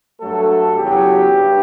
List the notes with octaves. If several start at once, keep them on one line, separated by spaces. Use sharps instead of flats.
G2 F#3 A3 A4
E2 C#3 F#3 G4
G2